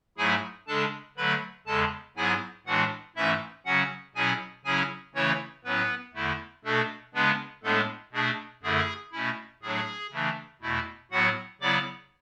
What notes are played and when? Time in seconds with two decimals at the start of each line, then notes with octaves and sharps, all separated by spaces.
0.17 G#2 F#3 A3 E4 G#4 G#5
0.67 C#3 G#3 D4 A4 A5
1.17 D3 F#3 A3 B4 B5
1.67 E2 C#3 G#3 A4 A5
2.17 G#2 F#3 B3 E4 G#4 G#5
2.66 A2 E3 G#3 D4 F#4 F#5
3.16 G#2 E3 A3 C#4 E4 E5
3.65 C#3 F#3 C#4 F#4 F#5
4.15 B2 F#3 C#4 E4 G#4 G#5
4.65 C#3 F#3 C#4 E4 G#4 G#5
5.15 C#3 E3 A3 C#4 E4 C#5
5.64 A2 F#3 B3 C#4 E4 B4
6.14 E2 D3 A3 E4
6.64 B2 A3 D4 A4
7.14 C#3 G#3 B3 D4 B4
7.63 A2 G#3 A3 B3 D4 A4
8.13 B2 A3 D4 G#4
8.63 F#2 D3 A3 E4 G#4
9.12 B2 A3 C#4 E4
9.62 A2 F#3 A3 D4 G#4
10.12 C#3 E3 A3 D4
10.62 E2 B2 A3 E4
11.11 A2 F#3 B3 E4 F#4 F#5
11.61 C#3 F#3 B3 E4 D5 D6